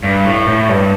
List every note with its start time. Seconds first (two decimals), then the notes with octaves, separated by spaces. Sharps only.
0.03 G2
0.25 A2
0.47 A2
0.69 G2